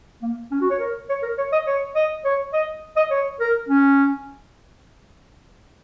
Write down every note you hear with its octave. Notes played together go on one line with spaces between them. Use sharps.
A#3
C#4
F#4
C#5
A#4
C#5
A#4
C#5
D#5
C#5
D#5
C#5
D#5
D#5
C#5
A#4
C#4